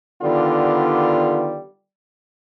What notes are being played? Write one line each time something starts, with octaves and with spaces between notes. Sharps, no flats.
D3 D#3 G3 B3 F4